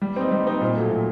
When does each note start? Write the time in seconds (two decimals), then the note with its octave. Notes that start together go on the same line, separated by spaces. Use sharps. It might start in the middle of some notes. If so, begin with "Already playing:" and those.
0.02 G3
0.16 C4 D#4
0.32 G3
0.47 C4 D#4
0.61 A#2
0.76 F#3 A3
0.91 A#2